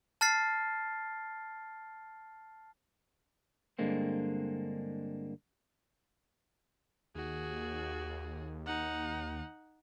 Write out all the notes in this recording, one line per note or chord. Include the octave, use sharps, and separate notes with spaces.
A5 F6 A6 C7
G2 D3 G#3 A#3 C4
D#2 F#4 G#4
D#4 F#5